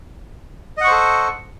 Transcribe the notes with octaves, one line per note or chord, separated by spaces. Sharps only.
A4 C5 D#5 F#5 C#6